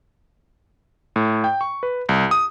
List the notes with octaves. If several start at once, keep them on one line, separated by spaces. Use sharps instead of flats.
A2
G5
C#6
B4
C2
D#6